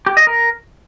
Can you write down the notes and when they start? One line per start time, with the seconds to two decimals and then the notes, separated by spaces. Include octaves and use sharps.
0.06 G4
0.17 D#5
0.27 A#4